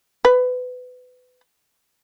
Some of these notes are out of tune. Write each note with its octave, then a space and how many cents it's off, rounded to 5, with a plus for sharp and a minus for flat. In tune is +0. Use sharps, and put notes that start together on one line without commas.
B4 +25